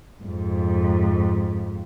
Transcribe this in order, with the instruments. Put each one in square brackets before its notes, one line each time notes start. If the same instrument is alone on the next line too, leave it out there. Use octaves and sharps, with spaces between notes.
[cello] F2 G#2